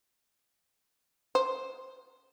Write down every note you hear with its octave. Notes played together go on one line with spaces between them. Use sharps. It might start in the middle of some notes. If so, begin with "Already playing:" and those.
C5